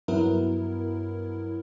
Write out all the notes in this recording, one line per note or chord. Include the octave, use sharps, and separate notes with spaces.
G2 F#3 B3 E4 A#4